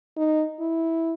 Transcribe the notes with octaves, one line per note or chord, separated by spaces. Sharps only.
D#4
E4